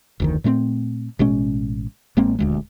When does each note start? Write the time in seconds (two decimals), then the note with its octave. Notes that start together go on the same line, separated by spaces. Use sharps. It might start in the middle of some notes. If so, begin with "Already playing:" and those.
0.20 F1 D2 D#3
0.44 A#2 A3 B3 C4
1.19 A1 B2 G#3 C#4
2.17 A1 G#3 A#3 C4
2.39 D#1 D2 G#3